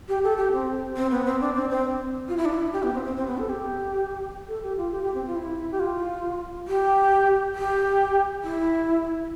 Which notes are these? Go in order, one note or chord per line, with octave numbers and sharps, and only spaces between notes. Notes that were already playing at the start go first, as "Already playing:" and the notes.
G4
A4
G4
C4
C4
B3
C4
D4
C4
C4
F4
E4
D4
E4
G4
B3
C4
C4
C4
B3
A4
G4
A4
G4
F4
G4
G4
C4
F4
E4
G4
F4
G4
G4
E4